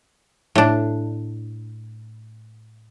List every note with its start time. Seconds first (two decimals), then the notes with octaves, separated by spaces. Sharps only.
0.55 A2 D4